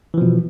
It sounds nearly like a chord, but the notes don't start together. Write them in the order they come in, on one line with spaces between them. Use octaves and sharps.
E3 F3 B2